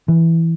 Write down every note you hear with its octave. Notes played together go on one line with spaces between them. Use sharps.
E3